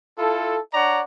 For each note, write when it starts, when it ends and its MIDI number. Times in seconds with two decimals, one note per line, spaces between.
0.19 0.58 64
0.19 0.58 65
0.19 0.58 69
0.73 1.00 62
0.73 1.00 73
0.73 1.00 74
0.73 1.00 78
0.73 1.00 82